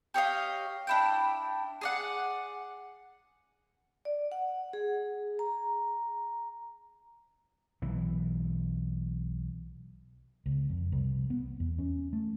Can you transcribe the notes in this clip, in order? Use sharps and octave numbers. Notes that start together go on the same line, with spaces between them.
G4 C#5 D#5 F5
D4 E4 G5
G#4 D5 F#5
D5
F#5
G#4
A#5
B1 E3
C#2
F2
C2
B3
E2
C#4
A3